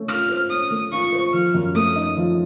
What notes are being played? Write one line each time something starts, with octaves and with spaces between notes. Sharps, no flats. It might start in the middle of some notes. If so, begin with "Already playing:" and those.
Already playing: A3 C#4
F4 F6
C5
C#4 D#6
A3
F4 C#6
C5
F3 F6
F#2
A3 D#6
D#4
F3